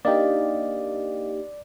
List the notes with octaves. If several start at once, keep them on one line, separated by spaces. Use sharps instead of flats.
A#3 D4 D#4 G4 D5 D#5 F5